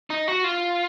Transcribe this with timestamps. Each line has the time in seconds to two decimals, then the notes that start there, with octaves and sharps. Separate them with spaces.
0.10 D#4
0.28 F#4
0.44 F4